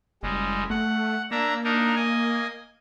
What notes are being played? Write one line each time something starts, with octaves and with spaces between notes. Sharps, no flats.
F#1 G3 G#3
A3 F#5
A#3 D4 E5 A#5
D4 D#4 A#4
D#5 G#5